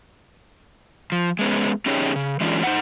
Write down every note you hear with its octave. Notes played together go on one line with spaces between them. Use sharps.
F3
G#3 B3 C#4
C#4 D#4 G4 G#4 C#5
C#3
E3 F#3 G#3 C#4 D4 F4
D#4 C5 F#5